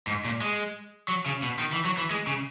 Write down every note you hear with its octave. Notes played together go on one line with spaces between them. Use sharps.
G#2
A#2
G#3
F#3
C#3
B2
D#3
E3
F#3
E3
G#3
C#3